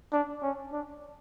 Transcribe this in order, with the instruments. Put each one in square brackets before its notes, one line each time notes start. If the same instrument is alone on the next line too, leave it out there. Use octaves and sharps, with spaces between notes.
[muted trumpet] D4
C#4
D4